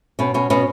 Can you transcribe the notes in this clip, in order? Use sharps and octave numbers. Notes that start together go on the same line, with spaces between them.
B2 C#4
B2 C#4
B2 C#4